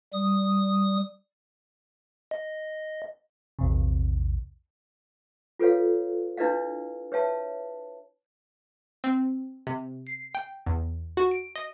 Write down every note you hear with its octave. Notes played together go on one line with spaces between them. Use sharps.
G3 D#6
D#5
A#1 E2 C3
F4 A4 B4 C#5 F5
D4 E4 B4 D5 D#5 F5
B4 C#5 E5 A5
C4
C3
C7
G5
E2
F#4
D7
D#5